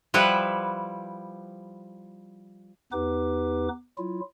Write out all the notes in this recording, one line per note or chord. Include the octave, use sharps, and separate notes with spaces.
F3 G3 E4 B4 F#5
E2 B3 D#4 G4 B4 D6
F#3 E4 F4